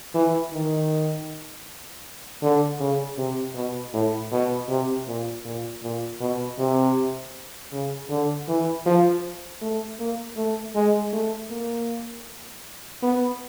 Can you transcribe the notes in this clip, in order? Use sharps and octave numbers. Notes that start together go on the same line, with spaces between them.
E3
D#3
D3
C#3
C3
B2
A2
B2
C3
A#2
A#2
A#2
B2
C3
C#3
D3
E3
F3
A3
A#3
A3
G#3
A3
A#3
B3